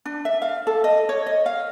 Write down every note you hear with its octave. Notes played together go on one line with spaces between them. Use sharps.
D4
E5
F5
A4
D#5
C#5
D#5
F5